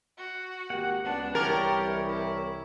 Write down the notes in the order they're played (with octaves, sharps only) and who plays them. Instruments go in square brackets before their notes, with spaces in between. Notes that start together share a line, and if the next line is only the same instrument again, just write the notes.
[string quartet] F#4
[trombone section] G#1 A#3 G4 [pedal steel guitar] F#5
[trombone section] C#2 B3 [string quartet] D4
[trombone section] C2 E3 [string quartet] G4 [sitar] A#4 [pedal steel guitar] C#5 D5 A5
[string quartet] E4